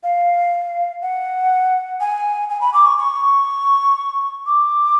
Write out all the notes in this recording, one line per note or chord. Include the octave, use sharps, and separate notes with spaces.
F5
F#5
G#5
G#5
B5
D6
C#6
C#6
D6